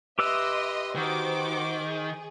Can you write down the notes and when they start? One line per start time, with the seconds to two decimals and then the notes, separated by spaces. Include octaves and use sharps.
0.19 G4 B4 D#5 E5 C6 E6
0.96 D#3 F#4 C5 D6
1.82 G#4